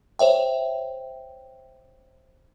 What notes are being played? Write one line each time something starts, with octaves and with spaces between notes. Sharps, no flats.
C5 C#5 E5 G5